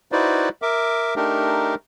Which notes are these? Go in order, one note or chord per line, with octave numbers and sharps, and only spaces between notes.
D#4 E4 F#4 B4 C5 D5
A#4 E5 D6
A3 D4 D#4 G4 A#4